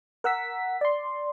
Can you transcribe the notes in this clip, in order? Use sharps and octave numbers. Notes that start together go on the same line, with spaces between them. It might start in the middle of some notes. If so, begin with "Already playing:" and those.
A#4 F#5 E6 B6
D5 C6